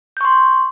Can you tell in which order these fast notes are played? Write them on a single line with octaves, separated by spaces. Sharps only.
G6 C#6 C6